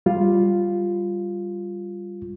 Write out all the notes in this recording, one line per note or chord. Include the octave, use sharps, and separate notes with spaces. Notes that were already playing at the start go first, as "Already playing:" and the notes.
G3 F4